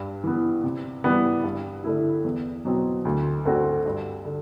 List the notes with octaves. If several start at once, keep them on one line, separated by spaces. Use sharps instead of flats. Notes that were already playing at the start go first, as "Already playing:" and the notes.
Already playing: G2
E3 B3
C3
E3 G3 B3
G2
D3 A3 E4
E2
B2 F#3 C4
D2
D3 A3 C4 F#4
G2
D3